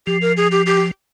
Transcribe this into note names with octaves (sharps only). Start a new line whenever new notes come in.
F3 G4
A#4
G#4
G4
G4